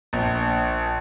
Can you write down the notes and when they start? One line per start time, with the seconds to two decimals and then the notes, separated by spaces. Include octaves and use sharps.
0.13 A#1